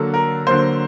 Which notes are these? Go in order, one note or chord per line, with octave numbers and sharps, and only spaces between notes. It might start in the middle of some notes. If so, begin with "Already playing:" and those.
Already playing: D3 F#3 A#3 A4
A#4
D3 F#3 A#3 C5